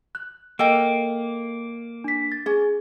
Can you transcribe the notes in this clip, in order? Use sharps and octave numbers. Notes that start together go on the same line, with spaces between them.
F#6
A#3 A4 D#5 G5
D4 B6
A6
C#4 G#4